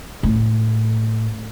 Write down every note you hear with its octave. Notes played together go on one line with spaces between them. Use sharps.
A2